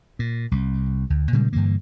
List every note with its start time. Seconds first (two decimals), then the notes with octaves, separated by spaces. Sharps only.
0.19 A#2
0.51 C2
1.10 D2
1.33 A#2 C#3 G3 G#3
1.53 G2 D3 E3 A#3